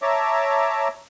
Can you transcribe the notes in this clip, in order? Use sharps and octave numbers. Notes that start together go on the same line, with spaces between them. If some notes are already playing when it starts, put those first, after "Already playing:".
C#5 E5 A5 A#5 D6